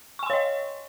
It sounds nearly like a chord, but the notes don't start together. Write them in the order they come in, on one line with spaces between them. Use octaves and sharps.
C#6 G#5 C6 C#5 D#5